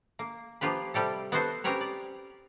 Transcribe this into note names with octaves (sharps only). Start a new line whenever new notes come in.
A#3
F3 A#3 F4 G4 B4
C3 G3 G4 A4
B3 E4 F#4 A4 C5
C4 C#4 G4 A#4 B4 C#5
D5